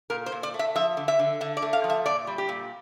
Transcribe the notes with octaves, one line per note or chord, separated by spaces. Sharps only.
A#2 A#4
C5
A#2
D5
A3
E5
F3 E5
D3
E5
D3
D3 E5
D5
A3
F5
F3
E5
A#2 D5
G3
G4
A#2